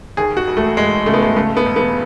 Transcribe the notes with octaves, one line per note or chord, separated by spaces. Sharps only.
D#2 G#4
F#4
E1
A3
E1 G#3
C#3 A3
B3
A3
C#3 A3
B3
E1
B3